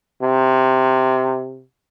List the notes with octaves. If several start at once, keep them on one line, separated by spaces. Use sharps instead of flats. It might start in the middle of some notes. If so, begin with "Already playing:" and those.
C3